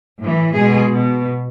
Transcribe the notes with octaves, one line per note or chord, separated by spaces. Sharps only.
A2 E3
B2 G#3 G#4
B2